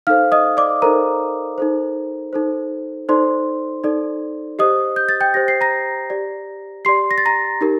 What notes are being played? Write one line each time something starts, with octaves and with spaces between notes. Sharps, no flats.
D#4 A4 C5 F5 F6
D#5 D#6
D5 D6
D#4 A4 A#4 C5 A#5
D#4 A4 C5
D#4 A4 C5
D#4 A4 C5 D5 C6
D#4 A4 D5
G4 C5 D#5 D#6
G6
A6
G5 G6
G4 C5 A#6
C7
A#5 A#6
G4 D5
G4 D5 C6 C7
A#6
A6
A#5 A#6
D#4 G4 A#4